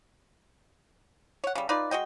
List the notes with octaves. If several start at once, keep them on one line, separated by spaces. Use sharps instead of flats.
C#5 F#5
C#3 G3
D#4 F4 B4 D5
G#3 F#4 D#5 G5